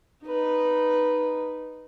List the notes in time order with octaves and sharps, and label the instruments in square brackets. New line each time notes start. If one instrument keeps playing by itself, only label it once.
[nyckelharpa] D#4 B4